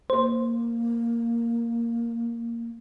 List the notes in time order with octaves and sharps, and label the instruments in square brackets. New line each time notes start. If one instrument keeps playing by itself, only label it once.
[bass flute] A#3 [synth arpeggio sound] C5